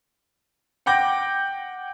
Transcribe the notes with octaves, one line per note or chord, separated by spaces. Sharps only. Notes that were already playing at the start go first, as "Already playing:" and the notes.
F#5 G5 D6 G6 A#6